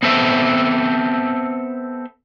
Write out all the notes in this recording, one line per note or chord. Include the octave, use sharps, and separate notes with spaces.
B3 C4 A4 E5